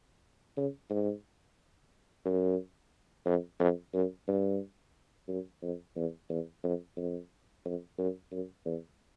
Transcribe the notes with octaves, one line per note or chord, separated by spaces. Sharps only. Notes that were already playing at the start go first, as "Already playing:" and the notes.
C#3
G#2
F#2
F2
F2
F#2
G2
F#2
F2
E2
E2
F2
F2
F2
F#2
F#2
E2